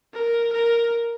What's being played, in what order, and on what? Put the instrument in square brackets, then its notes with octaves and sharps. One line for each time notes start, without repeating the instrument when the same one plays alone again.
[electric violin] A#4
A#4